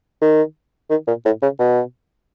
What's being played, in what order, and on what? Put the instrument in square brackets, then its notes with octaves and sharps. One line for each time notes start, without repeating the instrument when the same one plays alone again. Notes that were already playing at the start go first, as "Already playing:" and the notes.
[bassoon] D#3
D#3
A#2
A2
C#3
B2